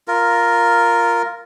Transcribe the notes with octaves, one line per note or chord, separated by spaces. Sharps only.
F4 A#4